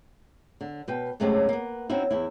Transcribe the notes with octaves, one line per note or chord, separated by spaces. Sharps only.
D3
B2 B4 G5
F#2 C3 G#3 A3 C4 C#4
A#3 B3
C4 C#4 D#4 E4 F#4
E2 E4